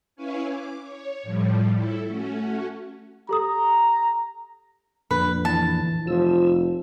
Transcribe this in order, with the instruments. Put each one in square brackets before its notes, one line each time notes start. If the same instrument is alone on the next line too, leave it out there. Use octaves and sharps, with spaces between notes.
[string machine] C#4 E4 B4 C#5 F5 G#5
D6
C#5
A2 F3 G3
E4 A4
A3 C#4 F#4
[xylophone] G4 A4 D#6 [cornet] A#5
[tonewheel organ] F2 A#2 D3 [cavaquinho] B4
[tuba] E3 [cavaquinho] A5
[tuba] F1 [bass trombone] F3 [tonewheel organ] E6